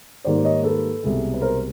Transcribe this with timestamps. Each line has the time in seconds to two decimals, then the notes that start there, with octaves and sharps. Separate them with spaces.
0.24 G#2 D#3 G3 A#3 C5 D5
0.45 C#5 D#5
0.63 A4 B4
1.03 C2 B2 G#3
1.34 B4
1.42 A#4 C5